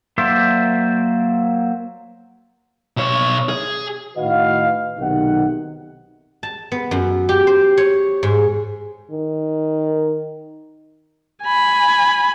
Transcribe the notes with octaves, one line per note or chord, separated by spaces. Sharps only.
F#3 A#3 C5 D5 E5
B2 C#5
G#4
A2 D#3 F#4 B4 D#5 F5
B1 C3 D#3 F#5
A5
B3
F#2
G4
C5
C#5
G#2
D#3
G#5 B5